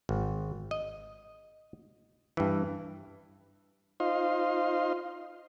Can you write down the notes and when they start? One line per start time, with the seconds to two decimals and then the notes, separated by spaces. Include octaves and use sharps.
0.09 G#1
0.71 D#5
2.37 G2 E3
4.00 D#4 F4 C5 D#5 F5 C6